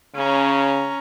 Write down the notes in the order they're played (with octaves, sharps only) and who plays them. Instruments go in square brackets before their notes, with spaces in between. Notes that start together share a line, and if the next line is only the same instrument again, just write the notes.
[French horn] C#3 [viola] C#4 A#5